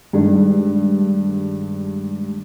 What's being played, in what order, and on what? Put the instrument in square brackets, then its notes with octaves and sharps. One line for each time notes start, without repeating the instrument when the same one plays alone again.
[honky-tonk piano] G2 [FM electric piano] D#3 G#3 A3